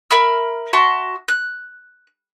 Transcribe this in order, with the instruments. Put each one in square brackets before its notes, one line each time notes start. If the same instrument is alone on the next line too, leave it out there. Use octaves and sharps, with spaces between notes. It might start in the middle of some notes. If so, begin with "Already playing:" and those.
[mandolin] A#4 E5 B5 F6
F#4 E5 A5 C6
F#6